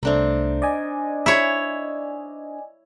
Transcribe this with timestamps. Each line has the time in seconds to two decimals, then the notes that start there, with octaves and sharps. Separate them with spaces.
0.03 C2 A3 C4 D4 D#4
0.62 D5 D#5 G#5
1.26 E4 C#5